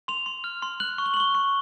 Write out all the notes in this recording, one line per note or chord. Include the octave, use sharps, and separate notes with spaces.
C6 F7
C6
F6
C6
F#6 F#7
C#6
G7
F#7
C#6 G7
C#6